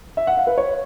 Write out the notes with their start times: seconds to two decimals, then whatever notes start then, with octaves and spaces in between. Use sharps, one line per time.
0.17 E5
0.27 F#5
0.37 F5
0.47 B4
0.58 C#5